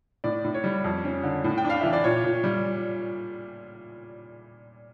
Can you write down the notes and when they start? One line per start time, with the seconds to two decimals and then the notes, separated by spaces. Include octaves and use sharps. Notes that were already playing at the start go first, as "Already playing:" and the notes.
0.24 A2 D5
0.44 A2
0.54 C#5
0.64 G3
0.84 F2
1.05 C#4
1.23 D3
1.44 A2
1.58 G5
1.65 D4
1.70 F5
1.81 E3 E5
1.93 D5
2.04 A#2 C#5
2.24 A#2
2.44 G3